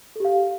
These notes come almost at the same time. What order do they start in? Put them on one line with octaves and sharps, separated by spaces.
A4 G4 F5